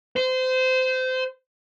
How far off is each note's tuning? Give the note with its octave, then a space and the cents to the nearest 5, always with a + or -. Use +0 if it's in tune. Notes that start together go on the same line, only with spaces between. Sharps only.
C5 -25